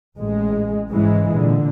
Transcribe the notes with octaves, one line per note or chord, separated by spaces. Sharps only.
A1 G#3
G#2 C#3 E3 G#3
A#2 D3